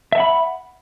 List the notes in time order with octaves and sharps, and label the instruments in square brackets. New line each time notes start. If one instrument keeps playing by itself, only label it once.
[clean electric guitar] E5
A5
F#5
B5